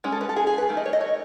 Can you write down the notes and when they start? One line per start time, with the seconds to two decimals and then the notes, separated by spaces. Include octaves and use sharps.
0.04 G#3 C#4 G#4
0.12 A4
0.21 B4
0.29 A4
0.36 G#4
0.47 G#4
0.58 B4
0.69 D#3 A3
0.77 D#5
0.86 C#5
0.93 D#5
1.01 C#5